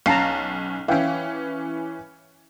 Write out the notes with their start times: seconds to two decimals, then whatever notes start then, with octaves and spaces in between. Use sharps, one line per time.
0.06 B1 C#4 F5 A5 A#5 C7
0.88 E3 C#4 E5 F5 G5